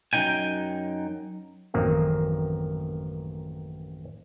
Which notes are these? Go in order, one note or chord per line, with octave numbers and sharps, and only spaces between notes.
F#2 A#3 D#4 G5 G#5
A1 F#2 D#3 A#3 C4